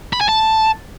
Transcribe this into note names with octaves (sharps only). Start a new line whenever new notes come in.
B5
G#5
A5